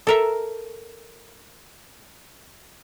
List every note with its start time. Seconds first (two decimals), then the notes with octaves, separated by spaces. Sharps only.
0.07 A4 A#4 E5